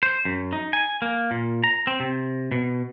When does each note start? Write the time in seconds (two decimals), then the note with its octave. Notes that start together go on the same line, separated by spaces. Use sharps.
0.03 C5
0.25 F#2
0.53 D#4
0.73 G#5
1.02 A#3
1.31 A#2
1.64 A#5
1.87 C4
2.00 C3
2.52 B2